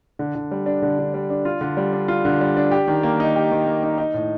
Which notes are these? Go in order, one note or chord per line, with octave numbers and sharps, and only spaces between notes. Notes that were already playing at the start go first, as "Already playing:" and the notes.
D3
D3
G3
D4
D3
D3
G3
D4
F4
D3
G3
D4
F4
D3
G3
D4
G4
D#3
A#3
D#4
G4
D#3
A#3
D#4
D#4
A2